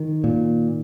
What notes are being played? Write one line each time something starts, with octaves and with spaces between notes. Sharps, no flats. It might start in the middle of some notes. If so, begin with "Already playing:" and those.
Already playing: D#3
A#2